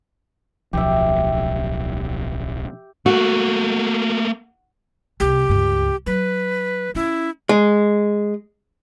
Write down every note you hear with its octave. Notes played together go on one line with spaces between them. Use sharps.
D1 B1 F3 G4 E5
A3 A#3 F#4
C2 C3 G4
C#2 G2
F#3 B4
C#4 E4
G#3